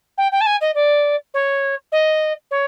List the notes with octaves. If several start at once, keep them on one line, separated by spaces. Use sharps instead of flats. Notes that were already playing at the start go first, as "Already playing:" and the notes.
G5
G5
A5
G#5
D#5
D5
C#5
D#5
C#5